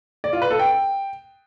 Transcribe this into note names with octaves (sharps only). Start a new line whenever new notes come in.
D5
F4
B4
A4
G5